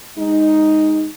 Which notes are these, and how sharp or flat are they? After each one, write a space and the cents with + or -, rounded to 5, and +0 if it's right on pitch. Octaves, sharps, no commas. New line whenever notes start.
G#3 -20 D#4 +0